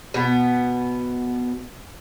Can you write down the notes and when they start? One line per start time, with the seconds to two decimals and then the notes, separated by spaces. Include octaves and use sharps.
0.14 B2 B3